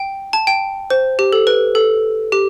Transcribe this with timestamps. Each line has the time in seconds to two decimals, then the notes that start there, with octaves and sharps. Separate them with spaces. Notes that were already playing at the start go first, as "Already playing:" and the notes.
Already playing: G5
0.33 A5
0.47 G5
0.90 C5
1.19 G4
1.32 A4
1.47 B4
1.75 A4
2.32 G4